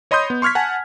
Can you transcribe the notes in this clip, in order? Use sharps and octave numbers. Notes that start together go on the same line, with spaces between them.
C#5 D#5 B5 C6 D#6 G6
B3
C6 C#6 F6 G#6 B6
F#5 G#5 A5